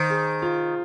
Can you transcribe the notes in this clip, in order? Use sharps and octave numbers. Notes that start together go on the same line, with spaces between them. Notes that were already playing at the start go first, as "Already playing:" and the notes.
Already playing: D#3 C5
G#4
F4